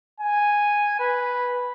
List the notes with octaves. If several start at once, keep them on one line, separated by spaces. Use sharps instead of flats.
G#5
B4